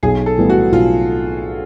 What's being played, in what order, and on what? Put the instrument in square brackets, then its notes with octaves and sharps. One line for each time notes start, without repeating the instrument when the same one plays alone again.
[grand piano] B1 [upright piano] G#4
[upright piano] A4
[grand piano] A2 E3 G3 B3
[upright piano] F#4
[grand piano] B1 [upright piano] F4